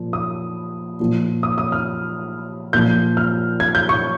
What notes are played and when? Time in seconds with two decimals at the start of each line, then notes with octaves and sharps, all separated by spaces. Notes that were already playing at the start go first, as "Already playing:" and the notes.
Already playing: A#2 F3
0.13 D#6
1.00 A#2 F3
1.43 D#6
1.58 D#6
1.72 F6
2.73 A#2 F3 G6
3.17 F6
3.60 G#6
3.75 G6
3.89 C#6